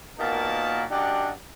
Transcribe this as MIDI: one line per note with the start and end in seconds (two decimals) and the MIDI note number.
0.18 0.83 46
0.18 0.83 58
0.18 0.83 59
0.18 0.83 63
0.18 0.83 66
0.18 0.83 81
0.91 1.30 42
0.91 1.30 62
0.91 1.30 67
0.91 1.30 74
0.91 1.30 75
0.91 1.30 78